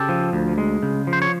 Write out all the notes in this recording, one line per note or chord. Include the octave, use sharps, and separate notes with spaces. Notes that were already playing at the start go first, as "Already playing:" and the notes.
Already playing: C#3 G4 A4
F3
D2
G#3
C#3
F3
C5
C#5